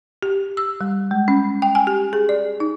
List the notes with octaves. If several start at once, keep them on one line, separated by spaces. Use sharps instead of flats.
G4
E6
G3
G#3
C#4
G5
G#5
G4
G#4
D5
D#4